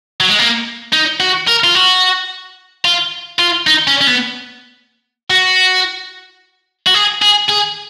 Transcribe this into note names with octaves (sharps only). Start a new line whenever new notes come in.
F#3
G#3
A#3
D#4
F#4
A#4
F4
F#4
F4
F4
D#4
C#4
C#4
B3
F#4
F#4
G#4
G#4
G#4